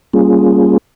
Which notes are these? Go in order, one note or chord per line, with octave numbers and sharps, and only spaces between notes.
G3 A#3 C#4 F4 G#4